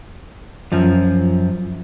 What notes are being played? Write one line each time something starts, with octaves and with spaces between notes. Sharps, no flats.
F#2 F3